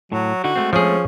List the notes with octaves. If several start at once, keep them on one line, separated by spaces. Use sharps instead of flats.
A2 F#3
D3 D#4 E4 F#4
G#3 A3 C4
F3 C#4 G#4